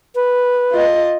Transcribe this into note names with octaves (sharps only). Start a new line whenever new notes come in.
B4
F4 D#5